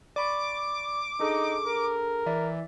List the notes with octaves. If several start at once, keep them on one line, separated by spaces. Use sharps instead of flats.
D5 B5 C#6 D6
D4 D#4 G#4 A4
A#4
E3 D5 E5